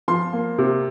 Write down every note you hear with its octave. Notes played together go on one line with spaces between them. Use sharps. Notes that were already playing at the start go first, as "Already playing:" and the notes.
F3 C6
A#3
C3